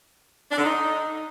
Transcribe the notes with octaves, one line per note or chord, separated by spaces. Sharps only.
D4
D3
D#4